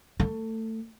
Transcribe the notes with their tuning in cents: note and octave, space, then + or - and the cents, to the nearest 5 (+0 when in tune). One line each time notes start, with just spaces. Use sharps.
A3 +20